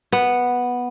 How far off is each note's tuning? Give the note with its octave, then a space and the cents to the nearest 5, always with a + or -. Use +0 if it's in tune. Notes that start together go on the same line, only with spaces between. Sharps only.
B3 -5